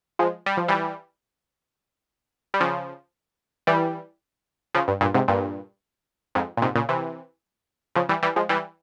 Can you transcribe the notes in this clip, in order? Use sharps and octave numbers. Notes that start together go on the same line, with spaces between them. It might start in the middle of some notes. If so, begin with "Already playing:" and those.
F3 G#3
G3
F3
E3 G3
G3
C#3 F3
E3 G3
C#3 F3
G2
G2 A#2
G#2 C3
G2 A#2
F2 G#2
A#2
G#2 C3
A#2 C#3
C3 E3
C#3 F3
E3 G3
E3 G3
F3 G#3
E3 G3